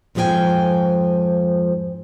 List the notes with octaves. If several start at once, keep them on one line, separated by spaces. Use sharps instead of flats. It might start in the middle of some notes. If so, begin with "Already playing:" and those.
F2 G#2 F3 G#4 G5 G#5